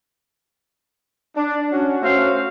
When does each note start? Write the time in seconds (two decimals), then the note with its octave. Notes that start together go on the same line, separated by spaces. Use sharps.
1.36 D4
1.72 C#4 F#4
2.02 A3 C#4 F#4 C5 F5